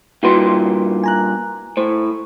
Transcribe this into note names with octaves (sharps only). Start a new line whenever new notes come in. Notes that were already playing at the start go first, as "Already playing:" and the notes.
G2 A#2 E4 F#4 B4 C6
G#5 A#5 F#6
A2 C5